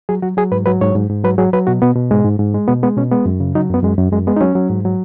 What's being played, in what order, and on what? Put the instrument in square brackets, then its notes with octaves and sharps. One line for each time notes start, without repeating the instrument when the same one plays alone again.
[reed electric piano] F#3 G#4
F#3 F#4
F#3 G#4
G#2 B4
F#3 B4
G#2 C#5
G#2
G#2
F#3 B4
F#3 G#4
F#3 B4
B2 F#4
B2 B3
B2
G#2 G#3
G#2
G#2
G#3
B2 B3
G#3 B3
B2 C#4
G#3 B3
F#2
C#3
F#3 D#4
F#2 B3
F#2 G#3
F#2
F#2 G#3
G#3 B3
D#4
F#3 C#4
F#3
G#2
F#3